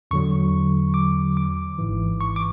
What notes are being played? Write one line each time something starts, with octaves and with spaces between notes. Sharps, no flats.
E2 D3 F#3 C#6
D6
D6
G#1 G#2 E3
C#6
D6